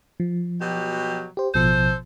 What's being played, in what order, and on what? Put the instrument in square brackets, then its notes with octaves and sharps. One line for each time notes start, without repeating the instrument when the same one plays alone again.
[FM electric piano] F3
[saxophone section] B2 F#3 G4
[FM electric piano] G4 C5
[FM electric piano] A1 B2 F3 [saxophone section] A4 C5